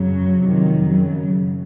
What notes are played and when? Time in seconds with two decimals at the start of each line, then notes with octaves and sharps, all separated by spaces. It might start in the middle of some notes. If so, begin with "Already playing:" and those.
Already playing: F#2 C#3 F#3
0.39 F2 C3 D#3
0.88 F#2 C#3 F#3